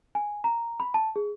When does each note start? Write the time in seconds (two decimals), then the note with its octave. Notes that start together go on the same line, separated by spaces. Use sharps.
0.15 G#5
0.44 A#5
0.80 B5
0.94 A5
1.16 G#4